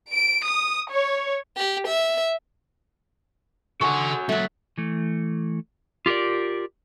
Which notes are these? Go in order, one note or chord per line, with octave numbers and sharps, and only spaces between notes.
D7
D#6
C#5
G4
E5
F#4 A4 F#5 G#5 C#6
F#3 A3 A#3 C#4
E3 A3
F4 G4 A4 A#4 D5